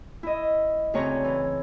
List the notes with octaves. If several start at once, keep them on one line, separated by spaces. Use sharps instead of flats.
E4 D#5
D2 C#3 C4 C#5 A#5
E3